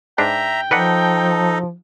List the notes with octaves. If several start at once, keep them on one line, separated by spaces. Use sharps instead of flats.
G#2 D4 B4 E5 G5 A#5
F3 D#4 A4 B4 D5 D#5 F#5